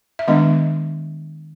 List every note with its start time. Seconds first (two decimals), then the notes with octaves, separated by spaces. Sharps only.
0.19 E5
0.28 D#3 G#3 B3 D4 D#5